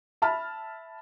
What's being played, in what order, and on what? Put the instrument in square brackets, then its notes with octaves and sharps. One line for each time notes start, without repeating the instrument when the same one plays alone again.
[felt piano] E5 A5 B5 F6